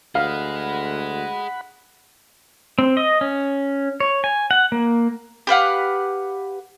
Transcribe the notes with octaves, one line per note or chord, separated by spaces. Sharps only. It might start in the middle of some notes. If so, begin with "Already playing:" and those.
D2 G#4 D#5 F5 F#5 B5
C4
D#5
C#4
C#5
G#5
F#5
A#3
G4 B4 F5 F#5